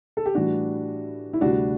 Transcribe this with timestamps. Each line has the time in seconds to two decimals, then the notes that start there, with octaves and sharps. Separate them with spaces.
0.17 A4
0.26 G4
0.35 A2 E3 G3 D4 F#4
1.33 E4
1.41 D2 C3 G3 D4 F#4